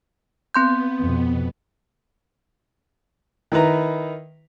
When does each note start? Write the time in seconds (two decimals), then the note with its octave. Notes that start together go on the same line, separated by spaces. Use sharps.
0.54 B3 C4 C6 G6
1.01 F2 B2
3.52 D#3 E4 B4 A#5